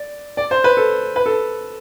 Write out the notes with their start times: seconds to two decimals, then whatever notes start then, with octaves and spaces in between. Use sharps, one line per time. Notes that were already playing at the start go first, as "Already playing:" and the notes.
Already playing: D5
0.37 D5
0.51 C5
0.64 B4
0.77 A4
1.16 B4
1.26 A4